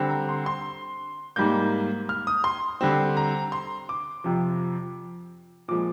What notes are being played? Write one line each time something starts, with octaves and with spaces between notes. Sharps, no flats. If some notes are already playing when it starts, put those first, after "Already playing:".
Already playing: D3 G3 C4
A#5
C6
C6
G#2 G3 A#3 G6
F6
D#6
C6
D3 G3 C4
A#5
C6
D6
F2 C3 F3
A#2 F3 G#3 D6